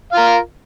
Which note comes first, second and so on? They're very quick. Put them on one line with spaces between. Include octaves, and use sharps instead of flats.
F5 F4 A#4